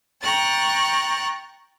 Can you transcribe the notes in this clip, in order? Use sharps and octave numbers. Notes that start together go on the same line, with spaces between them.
G5 A#5 C#6 F#6 A6